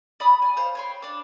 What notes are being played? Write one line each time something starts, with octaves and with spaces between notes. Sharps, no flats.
D5 B5 D#6
G#5
C5 C#5 F5
C#5 G5 C6
D4 D6